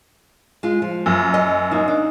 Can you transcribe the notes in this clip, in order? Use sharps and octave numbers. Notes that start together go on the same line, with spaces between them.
G#3 F4
F3
F#2
D#5
F#3 A#3 D#4
D4